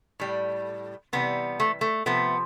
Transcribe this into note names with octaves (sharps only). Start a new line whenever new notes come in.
A2 G3
C3 E3 G3 B3
A3
A3
C3 F3 A3 B3